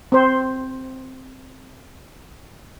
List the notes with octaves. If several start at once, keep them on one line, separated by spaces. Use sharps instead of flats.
C4 C5